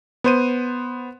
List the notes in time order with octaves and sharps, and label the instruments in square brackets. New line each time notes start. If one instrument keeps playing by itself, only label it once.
[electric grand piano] B3 C5 D#7